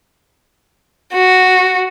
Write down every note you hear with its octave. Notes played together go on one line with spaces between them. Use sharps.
F#4